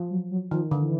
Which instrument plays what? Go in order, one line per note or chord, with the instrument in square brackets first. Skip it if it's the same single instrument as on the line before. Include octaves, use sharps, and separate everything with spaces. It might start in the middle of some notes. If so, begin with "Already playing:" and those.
Already playing: [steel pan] F3
[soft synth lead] F#3
F#3
[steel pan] D#3 [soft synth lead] F3
[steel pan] D3
[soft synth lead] E3